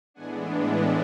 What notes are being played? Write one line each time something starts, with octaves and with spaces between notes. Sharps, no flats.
A2 E3 G#3 B3 D4 F#5 G#5